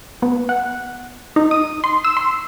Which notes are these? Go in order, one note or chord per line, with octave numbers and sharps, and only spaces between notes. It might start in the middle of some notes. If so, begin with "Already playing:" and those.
B3
F#5
D#4
D#6
C6
E6
C6